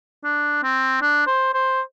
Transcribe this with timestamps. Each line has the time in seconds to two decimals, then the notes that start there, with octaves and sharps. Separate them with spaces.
0.24 D4
0.63 C4
1.02 D4
1.27 C5
1.54 C5